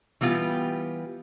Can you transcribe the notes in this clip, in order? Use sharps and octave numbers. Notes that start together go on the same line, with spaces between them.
E3 G3 B3 F4 G4